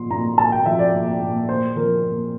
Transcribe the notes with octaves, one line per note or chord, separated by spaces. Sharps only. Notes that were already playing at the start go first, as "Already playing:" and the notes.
Already playing: A#2 F3 C6
A#2 A#5
A#3 A5
G5
F3 E5
D5
A#2
A#2
A#3 C5
F3 A#4
A#2